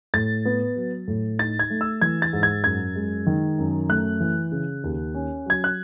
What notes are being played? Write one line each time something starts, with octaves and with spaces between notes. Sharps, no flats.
A2 A6
B3
F#3
A2
D#4 A6
G#6
A3
E6
E3 G#6
A6
G#2
G#6
F#2 G#6
G#3
D#3
F#2
A3 F#6
E3
C#3
D#2
C#4
F#3 G#6
F#6